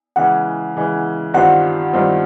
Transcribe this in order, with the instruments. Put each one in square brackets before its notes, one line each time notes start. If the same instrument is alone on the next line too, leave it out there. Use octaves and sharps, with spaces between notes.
[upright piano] C#3 E3 G#3 [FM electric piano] F#5
[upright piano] C#3 E3 G#3
[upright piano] G2 D#3 G3 C4 F4 [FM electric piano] F#5
[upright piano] G2 D#3 G3 C4 F4